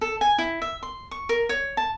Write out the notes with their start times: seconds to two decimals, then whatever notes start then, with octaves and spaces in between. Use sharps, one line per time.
0.01 A4
0.21 G#5
0.38 E4
0.62 E5
0.83 C6
1.11 C#6
1.29 A#4
1.49 C#5
1.77 A5